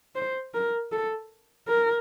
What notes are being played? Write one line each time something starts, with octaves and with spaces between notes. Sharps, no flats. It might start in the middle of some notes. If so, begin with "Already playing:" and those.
C5
A#4
A4
A#4